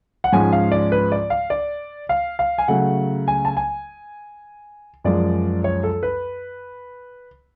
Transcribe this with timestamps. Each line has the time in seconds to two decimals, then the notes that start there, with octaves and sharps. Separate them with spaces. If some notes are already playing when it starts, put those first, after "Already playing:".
0.24 F#5
0.32 G#2 F3 G#3 C#4 G#5
0.52 F5
0.72 D5
0.92 B4
1.12 D5
1.30 F5
1.50 D5
2.09 F5
2.39 F5
2.58 G#5
2.68 C#3 F#3 A3 F#5
3.28 G#5
3.45 A5
3.57 G#5
5.04 F#2 F3 G#3 D5
5.64 C#5
5.83 A4
6.03 B4